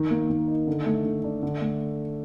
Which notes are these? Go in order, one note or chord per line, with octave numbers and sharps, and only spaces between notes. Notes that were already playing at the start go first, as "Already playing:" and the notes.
Already playing: D#3
A#3
D#3
D#4
D3
A3
D3
D4
D3
A3